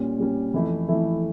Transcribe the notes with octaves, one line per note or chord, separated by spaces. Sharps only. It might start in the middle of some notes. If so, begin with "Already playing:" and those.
Already playing: A#2 G3 C#4
A#2 G3 C#4
F2 E3 A3 E4
F2 E3 A3 E4